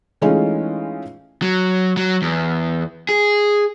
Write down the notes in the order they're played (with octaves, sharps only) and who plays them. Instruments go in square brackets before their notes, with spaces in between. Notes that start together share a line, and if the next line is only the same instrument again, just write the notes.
[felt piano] E3 G#3 A3 C#4 D#4 F4
[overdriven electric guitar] F#3
F#3
E2
G#4